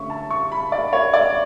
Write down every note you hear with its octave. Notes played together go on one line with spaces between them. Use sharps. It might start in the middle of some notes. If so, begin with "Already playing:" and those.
Already playing: D3 A3 C#4 E5 C#6
A5
C#6
B5
D5
C#5
D5